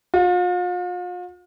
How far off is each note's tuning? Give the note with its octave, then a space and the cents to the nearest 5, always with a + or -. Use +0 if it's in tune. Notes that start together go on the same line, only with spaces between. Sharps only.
F4 +40